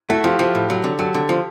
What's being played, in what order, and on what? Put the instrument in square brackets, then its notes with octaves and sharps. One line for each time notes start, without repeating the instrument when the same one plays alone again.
[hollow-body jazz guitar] A3 [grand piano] E4 F#4
[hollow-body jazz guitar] F3 [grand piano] F4 G4
[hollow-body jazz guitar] F3 [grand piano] G4 A4
[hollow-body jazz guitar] A2
F#3
D3
[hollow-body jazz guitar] F#3 [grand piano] G4 A4
[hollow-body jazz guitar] D3
F3